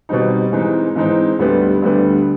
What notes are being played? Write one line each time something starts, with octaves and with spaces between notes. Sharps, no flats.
B2 G3 C4 D#4
G#2 E3 G#3 C4 D#4
G#2 E3 G#3 C4 D#4
D2 D3 G3 B3
D2 D3 G3 B3